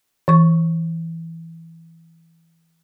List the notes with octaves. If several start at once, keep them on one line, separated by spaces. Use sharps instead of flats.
E3 C#6